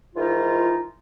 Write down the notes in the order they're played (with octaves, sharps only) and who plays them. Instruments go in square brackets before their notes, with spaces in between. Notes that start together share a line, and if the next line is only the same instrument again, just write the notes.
[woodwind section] G#2 D#3 E3 D#4 F4